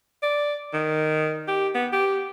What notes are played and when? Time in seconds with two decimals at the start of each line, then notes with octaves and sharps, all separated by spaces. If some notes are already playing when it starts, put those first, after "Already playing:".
0.23 D5
0.73 D#3
1.48 G4
1.75 B3
1.93 G4